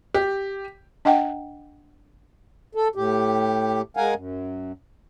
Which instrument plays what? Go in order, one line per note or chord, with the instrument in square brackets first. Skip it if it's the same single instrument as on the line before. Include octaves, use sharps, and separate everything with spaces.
[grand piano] G4
[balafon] D4 D#5 F#5 G5
[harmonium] A4
A2 G4
G#3 A#4 F5 F#5 G#5
F#2